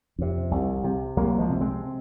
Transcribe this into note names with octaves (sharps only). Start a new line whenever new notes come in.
F2 C3
C2
C3
C2 F#3 A#3
F3 G#3
C3
G#3 C4